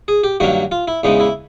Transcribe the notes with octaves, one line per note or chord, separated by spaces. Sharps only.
G#4
G4
G2 D#3 F#3 A#3 F#4
F4
E4
E2 C#3 E3 G#3 B3 D#4
E4